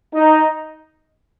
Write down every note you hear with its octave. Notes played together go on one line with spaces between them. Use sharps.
D#4